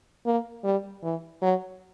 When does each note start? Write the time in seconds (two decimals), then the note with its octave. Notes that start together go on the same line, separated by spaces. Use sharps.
0.26 A#3
0.64 G3
1.03 E3
1.42 F#3